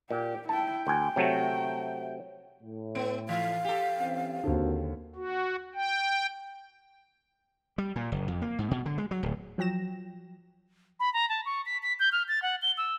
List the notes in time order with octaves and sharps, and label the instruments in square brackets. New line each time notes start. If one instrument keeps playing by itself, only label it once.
[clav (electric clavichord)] A#2 [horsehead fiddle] G4
[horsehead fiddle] E4 G5 [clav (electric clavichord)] A5
[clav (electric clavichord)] D2 G#5 [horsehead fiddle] G5
[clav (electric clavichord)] C3 F#3 A3
[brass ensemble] A2
[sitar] B3 [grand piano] D7
[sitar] E3 [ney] F5
[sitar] G4 A4
[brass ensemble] E3 C4 C#4
[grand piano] D#2 D3 [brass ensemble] A#3 C4 F#4
[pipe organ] F#4
G5
[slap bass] G3
A#2
F#1
F2
A#3
G#2
B2
D3
G#3
F#3
D1
[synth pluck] F3 F#3 G5 A#6 E7
[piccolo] B5
A#5
A5
C#6
B6
B6
G6
F6
A6
F#5
G7
E6